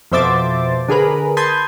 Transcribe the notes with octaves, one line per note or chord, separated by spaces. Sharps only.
F2 B2 C5 E5 D6 A6
D3 G#4 A#4 B4
A5 B5 C6 D#6 G6 G#6